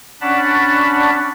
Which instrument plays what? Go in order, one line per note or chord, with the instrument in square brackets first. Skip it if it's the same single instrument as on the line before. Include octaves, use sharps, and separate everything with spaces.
[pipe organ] C#4 D4 D5 F#5 A5 B5